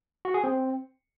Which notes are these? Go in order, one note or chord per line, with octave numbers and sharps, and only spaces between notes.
F#4
G#4
C4